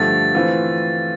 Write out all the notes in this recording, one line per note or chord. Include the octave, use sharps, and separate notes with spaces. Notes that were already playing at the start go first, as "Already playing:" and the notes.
Already playing: G2 D3 F3 A3 A6
E3 A3 C4 F4